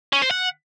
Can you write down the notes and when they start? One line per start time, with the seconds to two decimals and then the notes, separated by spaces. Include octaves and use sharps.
0.13 C#4
0.22 C5
0.31 F#5